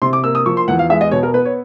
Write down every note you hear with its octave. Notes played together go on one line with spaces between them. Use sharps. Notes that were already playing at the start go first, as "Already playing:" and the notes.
C3 C6
D6
A#3 E6
D#6
F3 C#6
C6
E2 F#5
F5
G#3 E5
D#5
B2 C#5
A#4
B3 B4
C#5